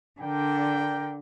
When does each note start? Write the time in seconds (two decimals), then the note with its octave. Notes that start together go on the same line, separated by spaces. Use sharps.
0.20 D3 A#4 D5 G5